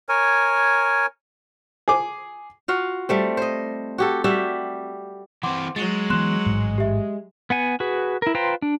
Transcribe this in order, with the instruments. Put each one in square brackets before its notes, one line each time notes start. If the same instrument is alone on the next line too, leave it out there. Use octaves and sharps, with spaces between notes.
[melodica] A#4 C#5 G#5
[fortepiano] G#4 D6
[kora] F4 F#4 F5
G3 A3 C4
C5 D#5
F#4 G4 A4
G3 F#4 G4 E5
[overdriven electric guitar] E3 C4 [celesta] F#5 C6 D6
[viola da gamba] F#3 [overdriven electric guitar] G#3 [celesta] A6
[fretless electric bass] E3 B3 [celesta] C6 F#6 E7
[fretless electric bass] A1 G#2
[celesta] G4 E5
[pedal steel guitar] B3 F#5 G#5
F#4 G#4 B4
E4 A#4
F4 B4 C5 G5 A#5
D4